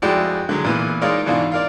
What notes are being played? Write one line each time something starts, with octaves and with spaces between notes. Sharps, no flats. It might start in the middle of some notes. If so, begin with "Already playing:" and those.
F2 G#3 E4 F#4 D5 G5
D3 F#3 G#3
A#2 E3 B3
G#3 D#4 F4 A#4 C#5 D5
G#2 B2 E3 D4 F4 F5
F4 A#4 D5